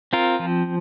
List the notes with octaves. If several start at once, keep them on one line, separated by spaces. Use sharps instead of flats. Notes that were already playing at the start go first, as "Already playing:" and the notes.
C4 F4 A#4
F3